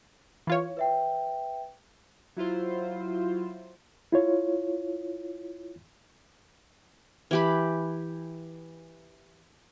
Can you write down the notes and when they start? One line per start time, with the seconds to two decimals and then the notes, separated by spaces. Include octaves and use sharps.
0.47 E3 F4 C#5
0.77 B4 E5 G5
2.37 F#3 E4 F4 C5
4.12 E4 F4 C#5
7.31 E3 G4 B5